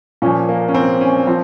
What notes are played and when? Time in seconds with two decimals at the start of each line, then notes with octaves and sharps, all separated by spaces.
0.22 A#2 C#4
0.26 F3
0.49 A#3
0.68 C#4
0.74 C4
1.01 C#4
1.27 F3 C4